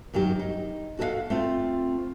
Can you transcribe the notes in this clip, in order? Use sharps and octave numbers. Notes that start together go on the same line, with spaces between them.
F#2 D#3 F#3 G4
D#4
F#4 A4 C#5 D#5 F5 F#5
A3 C4 F4